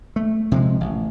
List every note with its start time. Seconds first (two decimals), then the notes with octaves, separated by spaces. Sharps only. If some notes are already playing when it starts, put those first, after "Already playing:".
0.16 A3
0.52 C3 F3 G3 G#3
0.80 A1